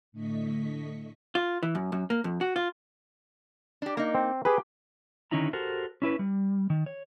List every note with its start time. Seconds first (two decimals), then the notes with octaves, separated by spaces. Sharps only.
0.12 A2 D3 A3 D#5 C#6 B6
1.35 F4
1.63 E3
1.75 F#2
1.92 F#2
2.10 A#3
2.24 F2
2.41 F#4
2.56 F4
3.82 D4 G4
3.97 A#3 D#4
4.15 C4
4.45 G4 G#4 B4
5.31 D3 D#3 C#4 D#4 E4 A#5
5.53 F#4 G4 A4 A#4 C5
6.02 C#4 E4 B4
6.19 G3
6.70 D#3
6.86 C#5